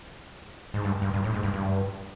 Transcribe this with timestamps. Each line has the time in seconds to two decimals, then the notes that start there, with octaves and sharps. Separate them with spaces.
0.74 G#2
0.84 G2
1.02 G2
1.14 G2
1.24 A2
1.34 G#2
1.43 G2
1.54 G2